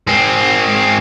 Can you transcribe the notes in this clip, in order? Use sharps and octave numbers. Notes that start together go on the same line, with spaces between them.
G#2 C4